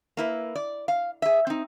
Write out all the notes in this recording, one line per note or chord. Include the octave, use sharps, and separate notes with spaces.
A#3 E4 B4
D5
F5
G#4 E5
C4 D#4